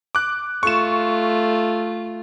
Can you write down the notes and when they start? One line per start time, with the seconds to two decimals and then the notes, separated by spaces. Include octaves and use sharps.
0.15 D6 F#6
0.63 A3 F4 C#6 E7